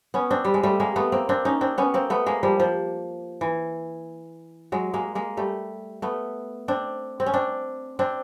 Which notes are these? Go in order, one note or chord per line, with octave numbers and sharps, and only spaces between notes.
B3 C#4
C4 D4
G3
G#3
G3 A3
G#3 A#3
A3 B3
A#3 C4
C4 D4
C#4 D#4
C4 D4
B3 C#4
A#3 C4
A3 B3
G#3 A#3
F3 G3
F3
E3
F#3 G#3
G#3 A#3
G#3 A#3
G3 A3
A3 B3
C4 D4
C4
C#4
C4 D4
C4 D4